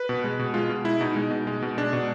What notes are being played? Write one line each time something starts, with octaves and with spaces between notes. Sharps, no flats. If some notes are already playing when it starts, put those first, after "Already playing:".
Already playing: B4
B2
G#3
B2
G#3 F4
B2
G#3 E4
B2 D#4
G#3
B2
G#3
B2
G#3 D4
B2